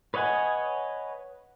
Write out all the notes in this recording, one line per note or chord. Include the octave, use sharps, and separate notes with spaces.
B4 C#5 D#5 F#5 G#5